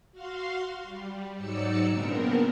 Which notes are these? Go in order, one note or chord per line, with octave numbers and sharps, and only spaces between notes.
F#4 F5 C6
G3
G#2 F#3 D#4 D5 E6 C#7
A#2 C#3 B3 C4 D4 A#4